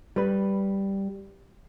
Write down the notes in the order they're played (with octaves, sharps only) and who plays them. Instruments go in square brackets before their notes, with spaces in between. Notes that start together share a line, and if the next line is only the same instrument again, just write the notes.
[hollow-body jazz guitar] G3 B4